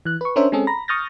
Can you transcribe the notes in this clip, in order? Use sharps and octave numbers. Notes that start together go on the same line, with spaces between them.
E3 F#6
B4 C#6
C#4 D4 A#4 C5 C#5 E5
G#3 C4 C#4 G#4 A4
A#5 B5 A#6
C#6 D#6 F6 G6 A6 A#6